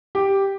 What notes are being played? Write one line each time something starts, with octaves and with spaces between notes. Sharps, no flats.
G4